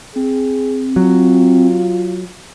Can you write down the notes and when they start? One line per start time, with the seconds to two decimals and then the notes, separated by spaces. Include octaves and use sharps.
0.16 C4 G#4
0.96 F#3 F4